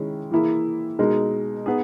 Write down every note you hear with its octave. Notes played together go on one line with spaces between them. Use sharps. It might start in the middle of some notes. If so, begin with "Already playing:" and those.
Already playing: D#3 G#3 C#4 E4
E3 A#3 E4 G#4
B2 G#3 D#4 A#4
B3 D#4 G#4